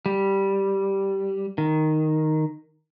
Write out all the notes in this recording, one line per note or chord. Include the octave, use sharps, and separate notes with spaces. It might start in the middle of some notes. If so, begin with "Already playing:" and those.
G3
D#3